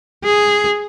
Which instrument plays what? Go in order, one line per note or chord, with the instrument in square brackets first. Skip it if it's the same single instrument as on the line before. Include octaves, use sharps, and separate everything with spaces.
[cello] G#4